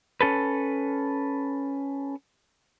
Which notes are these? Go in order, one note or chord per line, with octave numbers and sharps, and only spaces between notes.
C#4 A4 B4